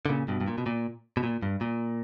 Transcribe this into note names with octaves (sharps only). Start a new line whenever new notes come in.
D3
A#2 C#3
G2 B2
G2
A#2
B2
A#2
B2
A#2
G2
A#2